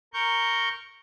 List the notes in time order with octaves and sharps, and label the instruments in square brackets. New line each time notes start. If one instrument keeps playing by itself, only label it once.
[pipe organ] A#4 C#6 G6